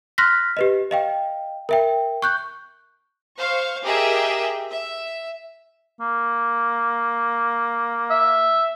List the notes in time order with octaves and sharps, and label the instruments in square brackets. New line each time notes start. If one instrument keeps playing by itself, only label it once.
[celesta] C6 F6 F#6 A#6 B6
G4 B4 D#5
D#5 F5 G5
A#4 E5 G5
C#6 F#6 G6
[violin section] C5 F5 C#6
G4 G#4 A#4 D#5 E5 G5
E5
[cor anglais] A#3
[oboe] E5